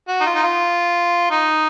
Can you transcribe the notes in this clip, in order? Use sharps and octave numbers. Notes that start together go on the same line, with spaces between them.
F#4
D#4
F4
D#4
F4
D#4